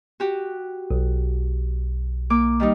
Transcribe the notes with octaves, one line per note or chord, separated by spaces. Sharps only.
F#4 G4
B1
A#3 D6
D#3 G3 D#4